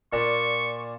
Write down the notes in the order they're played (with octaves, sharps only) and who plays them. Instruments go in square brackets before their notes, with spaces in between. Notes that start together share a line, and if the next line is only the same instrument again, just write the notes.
[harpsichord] A#2 D4 [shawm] C#6